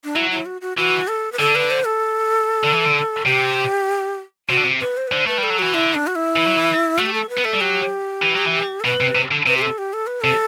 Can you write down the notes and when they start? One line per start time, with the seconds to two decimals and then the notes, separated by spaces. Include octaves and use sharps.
0.04 D4
0.16 F#3 E4
0.31 E4
0.46 F#4
0.61 F#4
0.77 E3 F#4
1.08 A4
1.32 B4
1.39 D3 A4
1.55 B4
1.71 C5
1.86 A4
2.64 D3
2.74 E3
2.85 D3
3.26 C3 G4
4.50 C3 F#4
4.57 D3
4.64 C3
4.81 B4
4.97 C5
5.07 B4
5.11 D3 C5
5.25 A3 B4
5.38 G3
5.43 A4
5.50 F#3
5.59 E3 F#4
5.74 D3 E4
5.94 D4
6.07 F#4
6.15 E4
6.36 E3
6.47 F#3
6.57 E3
6.98 A3 F#4
7.06 G4
7.14 A4
7.29 B4
7.38 B3
7.44 A3 A4
7.53 G3
7.61 F#3 G4
8.22 E3
8.35 F#3
8.46 E3
8.80 A4
8.85 B2 B4
9.01 C3
9.15 C3
9.32 D3
9.46 C3 B4
9.57 G4
9.62 A4
9.78 G4
9.93 A4
10.07 B4
10.21 C3 A4